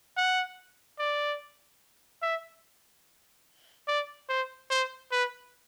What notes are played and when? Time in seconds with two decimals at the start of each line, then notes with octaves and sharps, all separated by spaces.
0.17 F#5
0.99 D5
2.22 E5
3.88 D5
4.29 C5
4.70 C5
5.12 B4